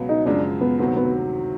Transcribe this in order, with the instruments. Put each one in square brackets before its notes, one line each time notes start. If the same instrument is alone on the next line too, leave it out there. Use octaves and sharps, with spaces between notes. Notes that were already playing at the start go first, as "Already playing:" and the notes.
Already playing: [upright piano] C#2 B2 F#3 B3
[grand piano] D#4
[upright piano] F#2 C#3 F3 G#3 [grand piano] D4
[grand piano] B3
[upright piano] D2 C3 D#3 F#3 [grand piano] B3
[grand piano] B3